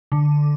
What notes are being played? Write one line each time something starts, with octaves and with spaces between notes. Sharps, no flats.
D3